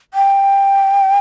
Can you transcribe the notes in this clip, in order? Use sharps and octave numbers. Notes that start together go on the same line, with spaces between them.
G5